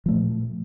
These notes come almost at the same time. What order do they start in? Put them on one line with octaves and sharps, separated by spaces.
F3 A3 A#2